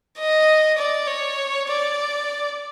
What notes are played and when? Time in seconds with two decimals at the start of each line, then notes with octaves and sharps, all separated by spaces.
0.18 D#5
0.78 D5
1.07 C#5
1.68 D5